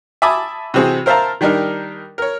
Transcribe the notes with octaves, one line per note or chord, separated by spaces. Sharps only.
E5 G#5 A5 B5 D6 D#6
C3 E3 C4 F#4 G#4
A#4 C5 E5 F5 A5 A#5
D#3 G3 D4 D#4 A#4
A#4 C#5